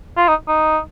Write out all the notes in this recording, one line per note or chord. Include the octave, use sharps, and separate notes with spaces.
F4
D#4
D#4